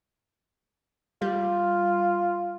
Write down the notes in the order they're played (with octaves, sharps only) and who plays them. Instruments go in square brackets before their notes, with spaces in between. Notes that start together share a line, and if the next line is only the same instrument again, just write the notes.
[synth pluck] G3 [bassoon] F4